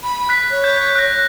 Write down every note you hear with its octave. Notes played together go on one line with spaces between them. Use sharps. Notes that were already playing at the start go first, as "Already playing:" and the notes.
B5
F#6 B6
C#5
G6
F#6 A#6